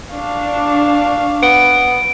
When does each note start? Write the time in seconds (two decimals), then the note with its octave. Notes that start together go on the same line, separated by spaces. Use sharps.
0.12 D4 F5 C#6
1.43 B3 D7